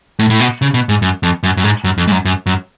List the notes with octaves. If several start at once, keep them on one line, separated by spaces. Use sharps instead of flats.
A2
A2
B2
C#3
B2
G#2
F#2
F2
F#2
F#2
G#2
F#2
F2
G#2
F#2
F#2
F#2